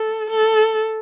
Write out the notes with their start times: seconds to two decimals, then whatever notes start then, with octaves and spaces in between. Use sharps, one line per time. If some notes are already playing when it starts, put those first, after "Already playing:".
Already playing: A4
0.31 A4